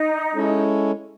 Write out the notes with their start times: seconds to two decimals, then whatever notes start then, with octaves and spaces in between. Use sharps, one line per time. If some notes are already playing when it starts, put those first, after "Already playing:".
Already playing: D#4
0.35 G#3 C#4 E4 A4 C#5